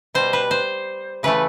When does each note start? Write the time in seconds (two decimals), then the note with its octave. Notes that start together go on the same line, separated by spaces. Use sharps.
0.14 B2 G3 C5
0.33 B4
0.51 C5
1.23 C#3 E3 A3 B4